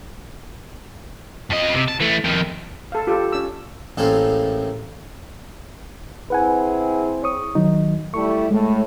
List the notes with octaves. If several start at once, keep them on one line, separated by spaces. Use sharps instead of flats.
F2 D#5
C3
A5
E3 A3
F2 D#3
A4 F5
F4 G4 A4
C#4 E6
A1 A2 A#3 C4 G#4 A4
C4 E4 G#4 B4 F#5 G#5
C#5 C#6 D#6
D#3 F#3 D#4
G3 A3 E4 C#6
A2 G#3 A3